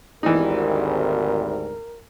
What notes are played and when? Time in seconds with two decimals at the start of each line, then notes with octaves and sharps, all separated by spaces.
0.23 G#1 D2 E3 G3 D#4 A#4